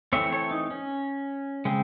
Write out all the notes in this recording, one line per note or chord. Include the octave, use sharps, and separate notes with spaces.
E3 A3 C4 C#5 E5
A4 C#5
D#4
C#4
C#3 G#3 C4